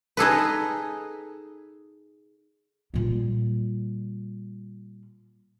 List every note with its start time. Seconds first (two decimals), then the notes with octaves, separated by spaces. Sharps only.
0.17 D#4 G#4 A4 B4
2.94 A#2 G3